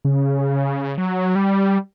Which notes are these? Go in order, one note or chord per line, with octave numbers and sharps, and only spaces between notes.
C#3
F#3
G3